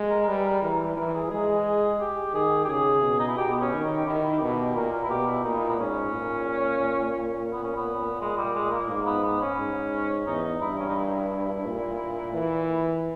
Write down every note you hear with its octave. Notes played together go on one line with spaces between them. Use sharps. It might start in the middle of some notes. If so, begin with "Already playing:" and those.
Already playing: G#3
A#4
A#4
G3 B4
A#4
E3 A#4
A#4
B4
E3 A#4
G#4
G#3 G#4
G4
D#3 G#4
G4
C#3 G#4
B2
D#4
E4
B2 G4
B3
C#4
D#3
D#4
G4
D#3 E4
E4
G4
B2 E4
G4
A#2 A#4
A#4
E4
B2 G4
E4
A#2 D#4
B3
G#2 C#4
A#2
B3
C#4
B3
G#3
G3
G#3
A#3
G#2 A#3
B3
B3
C#4
G#2
E2 D#4
G2 E4
C#4
D#4
E4
A#2
E3